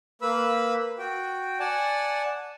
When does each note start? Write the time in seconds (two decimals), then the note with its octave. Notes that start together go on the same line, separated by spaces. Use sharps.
0.22 A#3 B4 B5 E6
0.99 F#4 G5
1.60 D5 F#5 G#5 A5